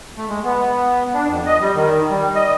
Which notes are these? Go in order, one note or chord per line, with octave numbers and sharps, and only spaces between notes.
A3
G#3
B3
D4
F2
D#5
G3
D#3
G3
D#5